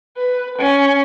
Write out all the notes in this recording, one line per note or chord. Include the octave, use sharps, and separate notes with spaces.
B4
C#4